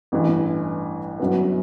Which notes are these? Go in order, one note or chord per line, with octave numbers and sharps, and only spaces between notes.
A1 G2 E3
G1 F#2 F#3 B3